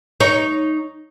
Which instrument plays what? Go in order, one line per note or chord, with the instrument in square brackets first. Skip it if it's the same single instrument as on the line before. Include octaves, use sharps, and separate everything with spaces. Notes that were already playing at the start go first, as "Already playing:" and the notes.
[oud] D#4 C#5